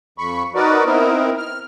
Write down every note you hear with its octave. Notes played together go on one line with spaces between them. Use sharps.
F2 B5 C#6
D#4 F#4 A#4 B4 D5
B3 C4 D#4 E4 A#4
F6